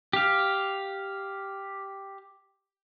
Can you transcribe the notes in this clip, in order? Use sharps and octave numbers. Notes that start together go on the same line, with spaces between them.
G4 F5